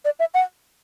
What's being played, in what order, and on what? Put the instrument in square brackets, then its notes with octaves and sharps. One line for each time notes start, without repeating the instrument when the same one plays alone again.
[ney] D5
E5
F#5